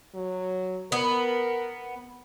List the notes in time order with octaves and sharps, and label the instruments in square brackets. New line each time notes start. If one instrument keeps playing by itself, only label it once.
[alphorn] F#3
[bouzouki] B3 [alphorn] A#4